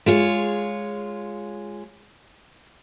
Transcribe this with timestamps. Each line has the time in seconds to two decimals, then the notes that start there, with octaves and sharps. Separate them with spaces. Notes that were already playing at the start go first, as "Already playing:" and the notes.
0.06 G#3 F4 C#5